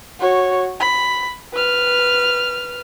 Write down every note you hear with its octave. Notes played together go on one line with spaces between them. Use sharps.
F#4 C#5
B5
B4 F6